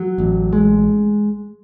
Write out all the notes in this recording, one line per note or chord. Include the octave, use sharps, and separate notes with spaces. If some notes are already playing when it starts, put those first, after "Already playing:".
Already playing: F#3
A1
G#3